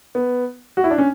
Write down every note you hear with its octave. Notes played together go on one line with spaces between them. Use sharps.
B3
F#4
E4
D4
C#4